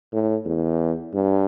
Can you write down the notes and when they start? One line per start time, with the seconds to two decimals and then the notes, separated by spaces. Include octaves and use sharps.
0.13 A2
0.46 E2
1.14 G2